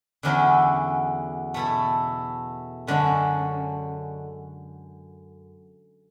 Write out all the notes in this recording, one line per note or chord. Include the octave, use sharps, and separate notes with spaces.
E2 D3 F#3 C#4 E4
B2 A3 E4 A4
F#2 D3 G#3 C#4